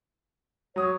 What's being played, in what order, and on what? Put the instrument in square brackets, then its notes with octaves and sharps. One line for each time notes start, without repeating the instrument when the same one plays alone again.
[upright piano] F#3 D#6 [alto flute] C#5